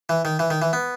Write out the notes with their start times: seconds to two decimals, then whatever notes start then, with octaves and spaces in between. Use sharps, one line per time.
0.09 E3
0.25 D#3
0.39 E3
0.50 D#3
0.62 E3
0.73 B3